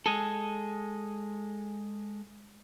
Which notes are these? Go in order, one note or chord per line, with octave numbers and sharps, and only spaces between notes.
G#3 G#4 A4